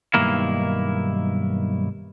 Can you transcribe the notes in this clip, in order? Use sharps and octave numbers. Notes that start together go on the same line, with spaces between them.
B1 G2 D#3 A#3 E4